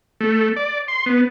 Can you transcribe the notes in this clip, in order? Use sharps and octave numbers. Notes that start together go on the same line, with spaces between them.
A3
D5
C6
B3